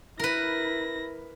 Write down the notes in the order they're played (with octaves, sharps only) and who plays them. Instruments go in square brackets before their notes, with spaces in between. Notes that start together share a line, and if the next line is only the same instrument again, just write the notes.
[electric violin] E4 A#6 [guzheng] A#4 B4